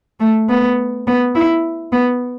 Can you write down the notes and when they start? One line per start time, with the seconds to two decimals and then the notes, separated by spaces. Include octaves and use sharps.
0.20 A3
0.49 B3
1.07 B3
1.35 E4
1.93 B3